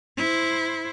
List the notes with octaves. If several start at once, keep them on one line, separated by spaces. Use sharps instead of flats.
E4 C5